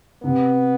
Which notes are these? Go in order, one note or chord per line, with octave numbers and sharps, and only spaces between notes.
C3 B3